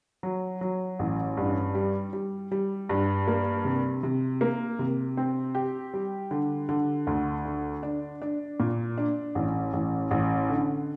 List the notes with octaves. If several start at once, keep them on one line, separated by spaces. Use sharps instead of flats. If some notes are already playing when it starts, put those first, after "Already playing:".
F#3
F#3
A1
G2
G3
G3
G3
G2
A#3
C3
C3
A#3
C3
C4
G4
G3
D3
D3
D2
D3
D4
D4
A#2
D4
A1
A1
A1
D3